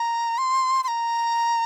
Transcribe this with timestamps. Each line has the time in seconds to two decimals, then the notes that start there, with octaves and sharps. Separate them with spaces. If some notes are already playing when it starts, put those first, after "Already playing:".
Already playing: A#5
0.38 C6
0.84 C6
0.88 A#5